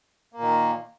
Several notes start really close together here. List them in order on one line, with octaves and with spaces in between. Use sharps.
A#3 A#2 D#3